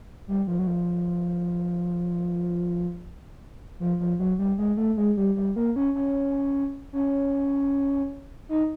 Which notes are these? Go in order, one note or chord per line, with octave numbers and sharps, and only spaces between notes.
G3
F3
F#3
F3
F3
F3
F#3
G3
G#3
A3
G#3
G3
G3
A#3
C#4
C#4
C#4
D#4